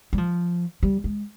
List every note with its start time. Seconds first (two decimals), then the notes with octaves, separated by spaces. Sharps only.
0.13 G3
0.18 F3
0.83 G3
1.04 G#3